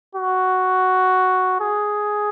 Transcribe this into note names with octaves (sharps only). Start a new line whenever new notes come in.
F#4
G#4